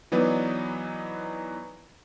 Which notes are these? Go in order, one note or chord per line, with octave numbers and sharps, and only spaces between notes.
E3 F#3 B3 D#4 B4 D5